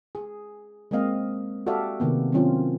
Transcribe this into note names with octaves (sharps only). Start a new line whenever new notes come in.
G#4
G#3 A#3 C4 D#5 F5
F#4 G4 A4 D5 E5 F5
C3 D#3 A#3 B3
D#3 F#3 C4 C#4 F4